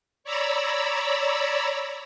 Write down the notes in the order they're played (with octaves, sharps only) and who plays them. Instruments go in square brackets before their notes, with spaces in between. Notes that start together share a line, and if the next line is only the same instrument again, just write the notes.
[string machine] C#5 D5 A#5 B5 E6